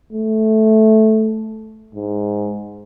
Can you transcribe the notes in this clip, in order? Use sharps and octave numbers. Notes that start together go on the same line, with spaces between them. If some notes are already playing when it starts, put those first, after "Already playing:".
A3
G#2